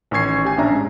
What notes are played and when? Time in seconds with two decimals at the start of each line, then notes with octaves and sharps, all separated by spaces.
0.11 A1 D#3 C#4 C#6 G#6 C7
0.45 G4 G#5
0.57 A#1 C#4 D4 E5 A#5
0.71 G#2